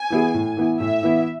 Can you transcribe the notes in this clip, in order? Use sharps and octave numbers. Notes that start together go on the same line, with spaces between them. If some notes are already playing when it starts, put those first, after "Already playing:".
Already playing: G#5
E3 B3 E4 G#4
A2
E3 B3 E4
A2 E5
E3 B3 E4